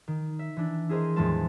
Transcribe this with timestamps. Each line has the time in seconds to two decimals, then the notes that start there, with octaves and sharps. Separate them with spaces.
0.08 D#3
0.39 E5
0.57 E3 D4
0.89 E4 G#4 A#4 C5 D#5
1.16 E2 A2 D#3 F3 G#3 A5